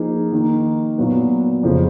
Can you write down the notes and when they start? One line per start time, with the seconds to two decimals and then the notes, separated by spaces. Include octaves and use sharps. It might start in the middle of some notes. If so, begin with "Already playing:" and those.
Already playing: F3 A#3 D#4 G#4
0.32 D#3 A#3 D#4
0.98 A#2 F#3 B3
1.63 F2 C#3 F3